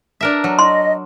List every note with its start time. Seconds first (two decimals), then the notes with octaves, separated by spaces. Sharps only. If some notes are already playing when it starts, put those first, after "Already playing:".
0.21 D4 A#4 E5
0.44 F#3
0.59 D#5 C6